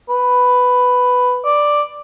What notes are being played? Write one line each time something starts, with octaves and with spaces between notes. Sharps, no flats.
B4
D5